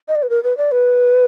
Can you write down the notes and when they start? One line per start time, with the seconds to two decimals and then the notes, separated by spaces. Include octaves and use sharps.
0.08 D#5
0.15 D5
0.23 B4
0.30 A#4
0.43 B4
0.57 D5
0.71 B4